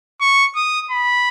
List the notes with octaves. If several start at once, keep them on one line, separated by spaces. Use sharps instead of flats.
C#6
D#6
B5